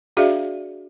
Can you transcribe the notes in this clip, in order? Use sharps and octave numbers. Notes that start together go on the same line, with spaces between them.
D4 F#4 G#4 D5 E5 F5